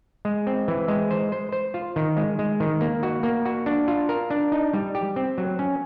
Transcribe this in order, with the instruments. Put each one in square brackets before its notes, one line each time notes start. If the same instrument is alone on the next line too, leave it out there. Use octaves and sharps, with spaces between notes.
[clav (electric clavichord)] G#3
C4
E3
G#3
C5
C5
C5
F4
D#3
G#3
G#3
D#3
A#3
F#4
A#3
F#4
D4
F4
A#4
D4
D#4
G3
G4
C4
F#3
C#4